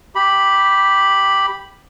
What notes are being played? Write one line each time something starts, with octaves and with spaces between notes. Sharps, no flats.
G4 B5